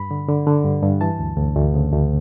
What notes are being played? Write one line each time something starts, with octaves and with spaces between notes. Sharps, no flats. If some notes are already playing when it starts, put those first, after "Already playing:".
Already playing: G2 B5
D3
D3
D3
G2
G2
E3 A5
D2
D2
D2
C#3
D2